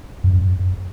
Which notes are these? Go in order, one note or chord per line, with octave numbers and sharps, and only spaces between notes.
F#2